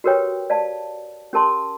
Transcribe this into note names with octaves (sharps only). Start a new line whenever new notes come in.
F#4 G4 A#4 B4 C#5 G5
D5 F5 A5
C#4 G4 A#4 A5 C6